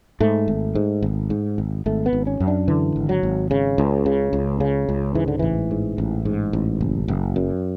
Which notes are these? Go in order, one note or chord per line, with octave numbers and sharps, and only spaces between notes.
G#2 A3
G#1
G#2
G#1
G#2
G#1
G#1 A3
B3
G#1
C#4
F#2
D4
D3 E3
G#1
F#3
G#1
C#3
C#2
C#3
C#2
C#3
C#2
G#2 E3
D3
A1 E3
G#2
A1
G#2
A1
F#1
F#1
F#2